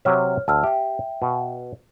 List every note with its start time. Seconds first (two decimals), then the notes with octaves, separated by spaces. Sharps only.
0.05 C3 F#3 C#5 E5 F6
0.48 D2 A5 E6 F6
0.64 G4 E5 G5
1.22 B2